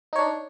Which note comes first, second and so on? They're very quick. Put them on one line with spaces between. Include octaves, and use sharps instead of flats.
D#4 C#5 D4